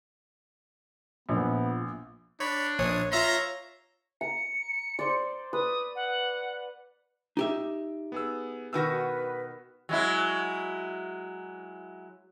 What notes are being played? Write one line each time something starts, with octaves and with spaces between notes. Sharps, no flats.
A#1 A#2 B3
D4 C#5 B5
A#1 C#5 D#6
F4 C#5 E5 A#5 C6
A#5 C#7
C5 D5
B4 D#6
F#5
D#4 G4 E5
B3 G#4 E6
B2 D#3 F#4 B4 E6 A#6
F#3 G#3 E4